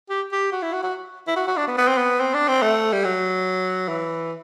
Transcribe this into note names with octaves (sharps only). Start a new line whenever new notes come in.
G4
G4
F#4
E4
F#4
F#4
E4
F#4
F#4
D4
B3
B3
C4
B3
C4
D4
C4
A3
G3
F#3
E3